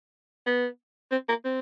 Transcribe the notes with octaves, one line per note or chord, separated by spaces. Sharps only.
B3
C4
A#3
C4